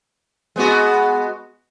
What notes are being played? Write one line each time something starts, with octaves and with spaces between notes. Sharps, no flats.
G#3 B3 F#4